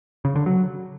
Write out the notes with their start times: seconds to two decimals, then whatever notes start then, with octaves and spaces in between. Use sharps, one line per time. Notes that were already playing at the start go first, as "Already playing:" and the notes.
0.25 C#3
0.35 D3
0.46 F#3